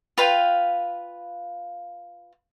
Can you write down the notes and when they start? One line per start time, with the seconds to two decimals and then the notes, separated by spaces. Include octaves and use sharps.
0.18 F4 B4 F5 G5